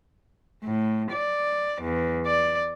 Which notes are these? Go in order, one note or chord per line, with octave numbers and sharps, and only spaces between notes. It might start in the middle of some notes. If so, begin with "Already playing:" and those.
A2
D5
E2
D5